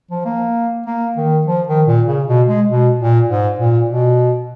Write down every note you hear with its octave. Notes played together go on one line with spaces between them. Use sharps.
F3
A#3
A#3
D#3
F3
D#3
A#2
C#3
B2
G#3
B2
A#2
G#2
A#2
B2